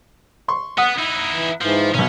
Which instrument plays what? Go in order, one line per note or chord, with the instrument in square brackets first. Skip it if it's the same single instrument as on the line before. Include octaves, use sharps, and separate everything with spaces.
[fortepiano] C6 C#6
[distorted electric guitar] B3 [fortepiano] F#5 D#6
[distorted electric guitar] D#4 E4
[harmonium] E3
[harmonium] G#2 E3 [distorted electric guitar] F3
[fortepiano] B1 B2 [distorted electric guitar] C#4